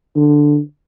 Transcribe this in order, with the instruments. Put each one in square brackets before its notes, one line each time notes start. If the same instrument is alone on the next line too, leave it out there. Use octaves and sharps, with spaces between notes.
[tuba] D3